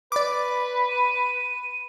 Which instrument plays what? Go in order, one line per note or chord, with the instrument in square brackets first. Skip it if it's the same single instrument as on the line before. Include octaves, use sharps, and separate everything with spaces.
[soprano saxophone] B4 [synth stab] D5 D6
[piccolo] D#7